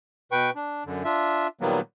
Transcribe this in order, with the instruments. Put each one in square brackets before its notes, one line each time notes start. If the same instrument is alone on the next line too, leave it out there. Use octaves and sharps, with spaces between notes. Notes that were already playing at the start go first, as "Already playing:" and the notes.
[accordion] B2 B4 G5 C#6
D4
F#2 D3
D4 F4 E5
A#2 D#3 F#3 G3 A#3 B3